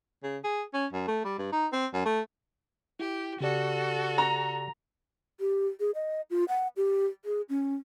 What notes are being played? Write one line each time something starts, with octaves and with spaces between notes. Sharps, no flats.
C#3
G#4
C#4
F#2
A3
G3
G2
D#4
C4
F#2
A3
E4 G4
C#3 F#4 G4 A4 D5
A#5
G4
G#4
D#5
F4
F#5
G4
G#4
C#4